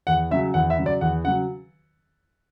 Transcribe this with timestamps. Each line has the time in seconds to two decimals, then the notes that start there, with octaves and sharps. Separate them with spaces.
0.07 E2 F#5
0.31 C#3 F#3 E5
0.54 E2 F#5
0.70 E5
0.77 C#3 F#3
0.86 D5
1.01 E2 F#5
1.24 C#3 F#5
1.28 F#3